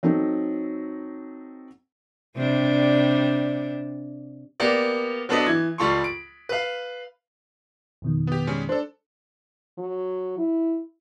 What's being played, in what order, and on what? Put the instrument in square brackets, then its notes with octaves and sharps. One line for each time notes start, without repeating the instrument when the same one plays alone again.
[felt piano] F#3 C4 D#4 A4
[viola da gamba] C3 G3 D4
[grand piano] A#3 B3 G4 A#4 D5
F#3 B3 D4 A4 B4 D#5
E3 G#6
C#2 G3 F4 A4 C6 C#6
D7
B4 F5
[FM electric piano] F2 B2 D#3
[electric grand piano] B3 G4
G3 G#3 C#4
[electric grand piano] D4 A4 [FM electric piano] C5 D5
[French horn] F#3
E4